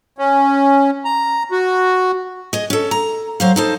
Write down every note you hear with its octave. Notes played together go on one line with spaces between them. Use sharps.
C#4
A#5
F#4
G#4 D#5
C#4 A4
A#5
F#3 C5 F5
D#4 A4 C5